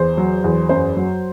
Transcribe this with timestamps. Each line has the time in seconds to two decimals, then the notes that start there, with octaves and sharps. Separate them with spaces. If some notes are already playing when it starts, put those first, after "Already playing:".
Already playing: E2 C5
0.17 F#3
0.44 E2
0.69 F#2 C5
0.96 F#3